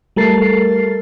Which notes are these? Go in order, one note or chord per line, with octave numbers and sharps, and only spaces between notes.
G3 A3 A4 A#4 A6 C7